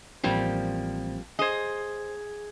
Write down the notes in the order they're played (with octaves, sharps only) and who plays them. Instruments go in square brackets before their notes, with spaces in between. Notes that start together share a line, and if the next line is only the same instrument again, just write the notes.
[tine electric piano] A1 C4 [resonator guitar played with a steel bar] F3 G3 A#3
[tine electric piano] G#4 G#6 [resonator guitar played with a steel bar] C5 D#5